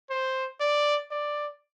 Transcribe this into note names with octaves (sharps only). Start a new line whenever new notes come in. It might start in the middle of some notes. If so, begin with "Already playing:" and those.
C5
D5
D5